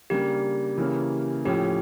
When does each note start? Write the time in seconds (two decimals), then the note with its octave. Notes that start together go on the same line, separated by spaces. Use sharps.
0.10 C#3 G3 A#3 D4 G4
0.77 C#3 E3 A#3 C#4
1.45 A2 F3 C#4 G4